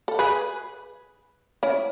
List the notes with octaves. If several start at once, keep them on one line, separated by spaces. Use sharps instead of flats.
A4
G#4 B4
C#4 E4